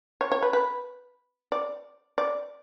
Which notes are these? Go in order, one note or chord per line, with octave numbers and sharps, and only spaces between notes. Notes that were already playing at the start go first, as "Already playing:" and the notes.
C#5
C#5
B4
B4
D5
D5